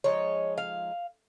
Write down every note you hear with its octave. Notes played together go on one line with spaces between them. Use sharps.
F3 G#3 D#4 C#5
F5